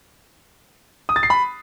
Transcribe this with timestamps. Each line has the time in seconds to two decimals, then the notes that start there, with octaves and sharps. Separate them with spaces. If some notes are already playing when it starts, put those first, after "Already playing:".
1.09 D#6
1.16 A6
1.23 C7
1.30 B5